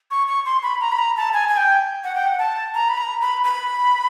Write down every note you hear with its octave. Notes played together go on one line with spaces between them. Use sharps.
C#6
C#6
C6
B5
A#5
B5
A#5
A5
G#5
G#5
G5
F#5
G5
F#5
A5
A#5
B5
A#5
B5
B5